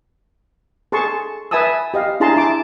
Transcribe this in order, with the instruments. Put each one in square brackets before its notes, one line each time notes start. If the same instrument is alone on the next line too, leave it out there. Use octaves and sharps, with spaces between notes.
[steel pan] G#4 A4 A5 C6 C#6
B4 E5 G#5 A5 D#6 E6
G4 D#5 F5
D4 E4 G#4 A5 A#5 C6
E4 A5 D6